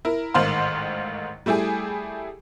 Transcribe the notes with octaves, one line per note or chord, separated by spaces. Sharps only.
E4 A#4
A1 G#2 D#3 C5 F5 C6
G3 A3 E4 G4 G#4